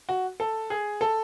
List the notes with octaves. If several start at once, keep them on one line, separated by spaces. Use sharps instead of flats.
F#4
A4
G#4
A4